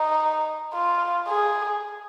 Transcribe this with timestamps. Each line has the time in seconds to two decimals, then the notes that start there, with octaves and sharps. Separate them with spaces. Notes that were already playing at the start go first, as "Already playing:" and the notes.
Already playing: D#4
0.74 F4
1.28 G#4